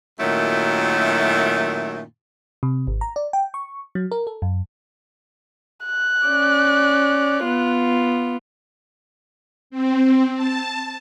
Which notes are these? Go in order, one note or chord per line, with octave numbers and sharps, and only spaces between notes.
F#2 A#2 D#3 F#3 A3 E4
C3
G#1
A#5
D5
G5
C#6
F#3
A#4
A4
F#2
F#6
C#4 D5
B3 F4
C4
A5